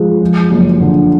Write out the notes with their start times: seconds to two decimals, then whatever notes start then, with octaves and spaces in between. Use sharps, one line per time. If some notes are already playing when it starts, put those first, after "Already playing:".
Already playing: F3 G#3
0.22 F2
0.51 F#1
0.81 D3